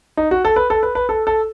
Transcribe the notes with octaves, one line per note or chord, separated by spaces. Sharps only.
D#4
F#4
A4
B4
A4
B4
B4
A4
A4